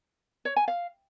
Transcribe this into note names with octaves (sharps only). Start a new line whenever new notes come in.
C#5
G#5
F5